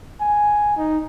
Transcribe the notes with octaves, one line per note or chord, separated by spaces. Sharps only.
G#5
D#4